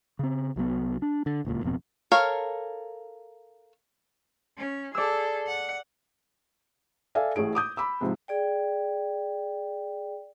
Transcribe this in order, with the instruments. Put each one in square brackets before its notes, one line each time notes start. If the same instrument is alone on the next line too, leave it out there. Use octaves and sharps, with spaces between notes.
[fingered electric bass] C#3 C4
C2 F#3 A#3 B3
D4
D3
D#1 C#2 A#2
D1 F2 B2 C4
[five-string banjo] A4 A#4 C#5 F5
[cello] C#4
[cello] G#4 A4 [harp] D5 E6
[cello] F#5
[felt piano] A4 D5 E5 F5 G#5
A1 A2 G#4 D7
D6 D#6 G6
B5 D6 E6
G#2 C3 F3
[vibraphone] G#4 D5 G5